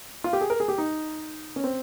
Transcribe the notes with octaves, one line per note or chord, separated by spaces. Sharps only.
F4
G4
G#4
A#4
G#4
G4
D#4
C#4
C4